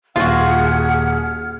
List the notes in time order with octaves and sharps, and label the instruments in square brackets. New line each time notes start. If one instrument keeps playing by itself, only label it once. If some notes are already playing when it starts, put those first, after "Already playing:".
[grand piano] D#1 [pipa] F4 F#4 [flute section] G#4 F#5 [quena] F6